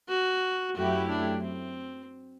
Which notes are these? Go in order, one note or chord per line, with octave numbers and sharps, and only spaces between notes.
F#4
F#2 F#3 A3 E4 F#4 G4
D4
C4